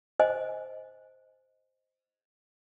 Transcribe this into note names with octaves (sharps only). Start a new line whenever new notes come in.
C5 D#5 G#5